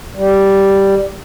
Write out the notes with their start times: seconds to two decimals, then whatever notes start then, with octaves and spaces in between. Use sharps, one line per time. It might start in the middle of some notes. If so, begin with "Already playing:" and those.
0.16 G3